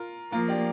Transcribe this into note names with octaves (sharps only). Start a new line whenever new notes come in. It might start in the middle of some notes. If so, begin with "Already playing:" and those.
Already playing: F4 A#4
F3 A#3 F4 A#4
D4 G4